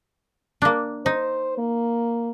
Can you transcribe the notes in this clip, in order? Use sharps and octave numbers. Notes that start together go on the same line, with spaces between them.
A#3 D4
D#4 C5
A#3